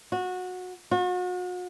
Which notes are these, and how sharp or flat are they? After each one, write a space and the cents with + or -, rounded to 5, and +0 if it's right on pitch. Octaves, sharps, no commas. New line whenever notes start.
F#4 -20
F#4 -40